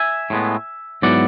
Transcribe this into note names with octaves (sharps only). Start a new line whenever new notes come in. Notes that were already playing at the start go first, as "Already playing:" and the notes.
Already playing: E5 G#5
A2 G#3 B3
G#2 F#3 B3 E4 D5 F#5